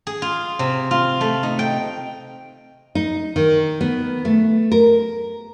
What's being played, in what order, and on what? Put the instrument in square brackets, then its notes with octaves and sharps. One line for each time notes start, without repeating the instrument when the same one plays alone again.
[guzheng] G#4
F4
C3
F4
A3
D#4
G5
[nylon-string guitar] D#4
D#3
B3
A3
A#4